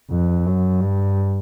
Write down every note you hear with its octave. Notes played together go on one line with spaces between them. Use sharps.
F2
F#2
G2